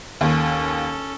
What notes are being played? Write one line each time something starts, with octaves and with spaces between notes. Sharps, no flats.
D#2 C#4 A4